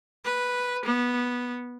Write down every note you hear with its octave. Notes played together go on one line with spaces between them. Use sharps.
B4
B3